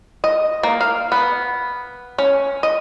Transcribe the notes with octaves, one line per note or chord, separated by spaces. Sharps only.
D#5
A#3
F5
B3
C#4
D#5